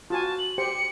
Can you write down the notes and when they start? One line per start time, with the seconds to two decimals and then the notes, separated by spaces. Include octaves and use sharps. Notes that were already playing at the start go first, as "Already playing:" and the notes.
0.10 F4 F#4 G#5 A5
0.39 F#7
0.58 G4 C5 G5 C#7